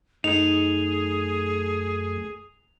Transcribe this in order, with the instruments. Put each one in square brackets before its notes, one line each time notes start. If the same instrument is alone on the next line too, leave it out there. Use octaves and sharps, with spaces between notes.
[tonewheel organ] F#2 A3 [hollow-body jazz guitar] D#4 [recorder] G#4 [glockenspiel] F7